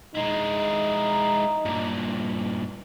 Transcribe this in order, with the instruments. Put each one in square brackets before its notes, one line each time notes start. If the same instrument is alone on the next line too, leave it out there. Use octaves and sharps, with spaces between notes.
[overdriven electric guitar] G#3 E4 [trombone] D#4
[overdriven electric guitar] G2 A#2